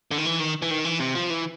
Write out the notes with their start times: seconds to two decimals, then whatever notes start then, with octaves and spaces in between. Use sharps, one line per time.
0.11 D3
0.18 D#3
0.25 E3
0.40 D#3
0.62 E3
0.70 D#3
0.85 E3
1.00 C3
1.15 F3
1.30 E3